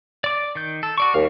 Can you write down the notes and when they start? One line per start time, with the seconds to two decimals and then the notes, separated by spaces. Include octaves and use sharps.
0.24 D5 D6
0.55 D#3 G6
0.83 A4
0.98 F#4 D5 C#6
1.14 D#2 G3 F5